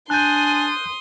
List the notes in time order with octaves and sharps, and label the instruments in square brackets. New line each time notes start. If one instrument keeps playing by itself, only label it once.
[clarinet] D4 [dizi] G#5 [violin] C6 D#6 [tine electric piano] F#6 G6